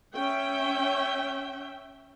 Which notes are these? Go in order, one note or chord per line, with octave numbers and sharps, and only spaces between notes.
C#4 E5 G5